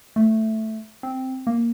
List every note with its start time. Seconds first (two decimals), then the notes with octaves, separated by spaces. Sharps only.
0.16 A3
1.03 C4
1.47 A#3